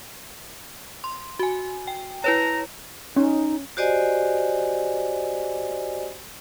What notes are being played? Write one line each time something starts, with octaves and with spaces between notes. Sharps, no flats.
C6
F#4 G#5
G5
E4 B4 C#5 A#5
C#4 D#4
F#4 G4 C5 D5 D#5 G#5